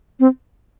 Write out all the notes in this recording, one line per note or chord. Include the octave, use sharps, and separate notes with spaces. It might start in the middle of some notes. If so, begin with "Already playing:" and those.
C4